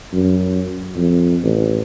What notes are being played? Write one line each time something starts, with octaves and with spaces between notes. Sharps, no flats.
F#2
F2
A1